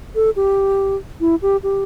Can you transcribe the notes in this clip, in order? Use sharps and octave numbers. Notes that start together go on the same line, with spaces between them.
A4
G4
E4
G4
G4